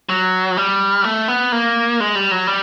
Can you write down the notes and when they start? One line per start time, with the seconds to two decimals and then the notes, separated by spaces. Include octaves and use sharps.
0.09 F#3
0.57 G3
1.04 A3
1.28 B3
1.52 A#3
2.00 G#3
2.15 G3
2.31 F#3
2.47 G3